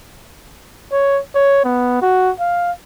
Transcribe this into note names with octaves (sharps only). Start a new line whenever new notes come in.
C#5
C#5
B3
F#4
F5